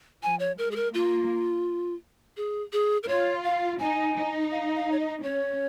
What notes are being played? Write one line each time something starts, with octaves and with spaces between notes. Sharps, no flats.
F3 G#5
C#5
G#3 A#4
G#4
A#4
A#3 F4
G#4
G#4
A#4
F4 C#5
F5
D#4 G#5
D#4
F5
F5
C#5
D#5
C#4 C#5